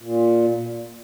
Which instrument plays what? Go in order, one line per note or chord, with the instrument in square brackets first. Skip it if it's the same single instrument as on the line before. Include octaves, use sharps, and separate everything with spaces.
[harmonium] A#2